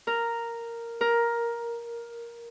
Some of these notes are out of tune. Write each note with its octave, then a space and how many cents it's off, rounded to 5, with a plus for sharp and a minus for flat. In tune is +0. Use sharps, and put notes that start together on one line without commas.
A#4 -5
A#4 +10